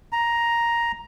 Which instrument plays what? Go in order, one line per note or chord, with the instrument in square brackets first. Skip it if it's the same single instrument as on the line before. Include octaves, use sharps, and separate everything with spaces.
[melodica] A#5